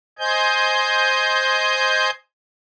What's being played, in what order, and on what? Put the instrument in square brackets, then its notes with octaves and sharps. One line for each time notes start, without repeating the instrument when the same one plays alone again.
[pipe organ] C5 D#5 G#5 G6